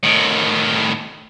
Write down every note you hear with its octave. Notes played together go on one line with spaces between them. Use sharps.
A2 D#3